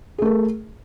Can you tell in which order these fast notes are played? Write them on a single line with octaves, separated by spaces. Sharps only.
G#4 A3 A#4